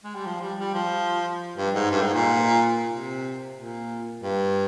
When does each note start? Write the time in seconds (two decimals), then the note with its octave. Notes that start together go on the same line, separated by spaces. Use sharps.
0.04 G#3
0.15 G3
0.26 F3
0.42 G3
0.59 G3
0.75 F3
1.58 G2
1.75 G#2
1.91 G2
2.02 G#2
2.14 A#2
2.90 C3
3.57 A#2
4.22 G2